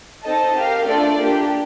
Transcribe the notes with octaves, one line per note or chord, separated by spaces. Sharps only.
C4 D#4 A4 D#5 A5
G4 A#4 F5
A3 D4 F4 A4 D5
A#3 D4 G4